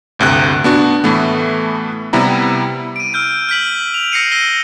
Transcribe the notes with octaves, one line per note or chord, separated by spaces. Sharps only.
G1 D2 C3 F#6
B3 D4 F#4
A2 E3 A3 B3
C3 G3 B3 E4 A#5
D7 D#7
E6 F6 G6 D7
F6 G6 B6 F#7
F7
E6 A#6 C7 C#7 D#7
E6 A#6 D#7 G7